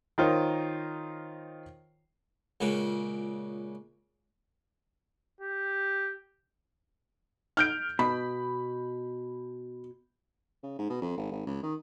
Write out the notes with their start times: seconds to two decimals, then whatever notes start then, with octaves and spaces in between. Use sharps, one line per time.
0.18 D#3 D#4 F4 A#4 C5 C#5
2.60 C#2 A#2 C#3 F#4
5.41 G4
7.57 F6 G6 D7
7.99 B2 B5
10.63 C#3
10.79 G#2
10.90 B2
11.02 F2
11.17 G#1
11.31 G#1
11.46 C#2
11.63 D#3